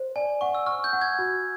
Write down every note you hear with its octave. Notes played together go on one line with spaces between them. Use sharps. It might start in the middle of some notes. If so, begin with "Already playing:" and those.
Already playing: C5
D5 G#5
F#5 C#6
E6
C#6 F6
G6
F#5
G#6
F#4